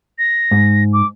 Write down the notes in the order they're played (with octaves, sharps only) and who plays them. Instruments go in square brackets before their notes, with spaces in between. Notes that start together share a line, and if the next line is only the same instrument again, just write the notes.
[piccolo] A#6
[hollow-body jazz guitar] G#2
[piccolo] D6